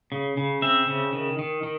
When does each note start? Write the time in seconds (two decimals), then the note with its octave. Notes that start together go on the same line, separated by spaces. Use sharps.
0.12 C#3
0.37 C#3
0.62 C4 E5
0.88 C#3
1.13 D#3
1.39 D#3
1.63 D#3